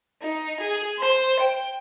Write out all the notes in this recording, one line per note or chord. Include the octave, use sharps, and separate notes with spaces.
D#4
G#4
C5
G5